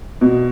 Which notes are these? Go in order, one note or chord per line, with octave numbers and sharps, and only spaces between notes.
B2